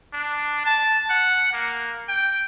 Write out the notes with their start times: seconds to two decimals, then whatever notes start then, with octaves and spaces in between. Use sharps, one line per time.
0.13 D4
0.65 A5
1.10 F#5
1.53 A#3
2.09 G5